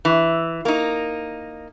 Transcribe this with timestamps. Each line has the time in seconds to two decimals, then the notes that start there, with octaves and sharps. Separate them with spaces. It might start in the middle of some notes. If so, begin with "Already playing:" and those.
0.05 E3
0.65 A#3 D#4